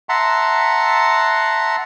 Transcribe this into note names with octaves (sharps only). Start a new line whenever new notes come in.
E5 F#5 A5 A#5 C6